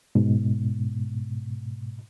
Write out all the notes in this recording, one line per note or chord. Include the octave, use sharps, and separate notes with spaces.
G#2 B2